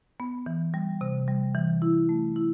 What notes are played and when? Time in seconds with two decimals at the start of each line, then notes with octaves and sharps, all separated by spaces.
0.20 B3
0.46 E3
0.74 G3
1.01 C3
1.28 G3
1.55 E3
1.82 E4
2.09 A3
2.36 E4